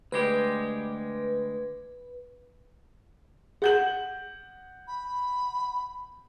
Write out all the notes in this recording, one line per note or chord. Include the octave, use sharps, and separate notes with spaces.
D2 G#3 G4 B4
G#4 F#5 G6 F#7
B5